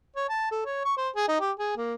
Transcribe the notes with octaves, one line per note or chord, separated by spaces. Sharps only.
C#5
A5
A4
C#5
C#6
C5
G#4
D#4
G4
G#4
A#3